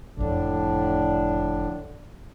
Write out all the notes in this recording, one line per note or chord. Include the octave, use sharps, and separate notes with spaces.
F#1 F2 A2 D3 D4